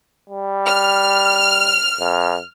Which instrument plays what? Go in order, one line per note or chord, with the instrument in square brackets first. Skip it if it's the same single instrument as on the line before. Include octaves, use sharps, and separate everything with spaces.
[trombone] G3
[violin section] F6
[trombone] F2